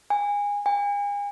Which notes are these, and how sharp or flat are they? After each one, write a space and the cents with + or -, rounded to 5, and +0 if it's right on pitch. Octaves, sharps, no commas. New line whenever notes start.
G#5 -25
G#5 -40